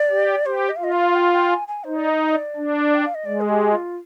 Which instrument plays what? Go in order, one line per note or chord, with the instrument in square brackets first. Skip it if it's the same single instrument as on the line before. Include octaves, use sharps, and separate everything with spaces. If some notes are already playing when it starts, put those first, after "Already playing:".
Already playing: [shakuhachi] D5
[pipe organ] G4
[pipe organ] G4 [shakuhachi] C5
[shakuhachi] D#5
F5
[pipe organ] F4 [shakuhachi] D#5
[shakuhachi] F5
G5
G5
G#5
G#5
[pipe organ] D#4 [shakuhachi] C5
[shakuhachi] D5
D#5
D#5
D5
[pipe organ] D4
[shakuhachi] G5
F5
D#5
[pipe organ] G#3 [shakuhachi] D5
[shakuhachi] G#4
G4
F4